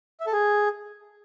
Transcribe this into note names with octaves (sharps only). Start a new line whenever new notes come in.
E5
A4
G#4